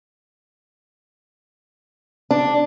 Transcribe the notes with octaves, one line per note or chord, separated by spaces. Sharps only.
D4